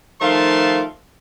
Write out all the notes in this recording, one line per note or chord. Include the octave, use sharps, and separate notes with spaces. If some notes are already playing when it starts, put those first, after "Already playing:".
D#3 F3 A3 F5 A5 C6